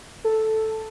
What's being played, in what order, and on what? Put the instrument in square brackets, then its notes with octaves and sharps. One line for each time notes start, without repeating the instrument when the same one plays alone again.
[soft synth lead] A4